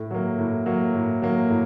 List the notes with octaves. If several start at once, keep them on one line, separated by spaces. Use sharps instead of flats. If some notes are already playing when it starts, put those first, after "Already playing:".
Already playing: A2
F#3 A#3
A2
F#3 A#3
A2
F#3 A#3
A2